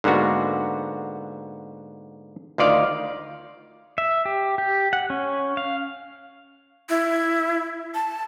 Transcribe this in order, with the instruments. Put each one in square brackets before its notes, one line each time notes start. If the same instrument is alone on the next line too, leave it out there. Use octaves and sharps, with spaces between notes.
[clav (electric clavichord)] G#2 D3 A#3 B3 F#4
D2 D#3 F4 D5 F5
[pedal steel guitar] E5
G4
G4
F#5
C#4
F5
[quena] E4
A5